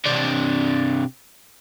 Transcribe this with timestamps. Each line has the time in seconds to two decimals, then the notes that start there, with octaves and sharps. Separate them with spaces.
0.06 C3 D4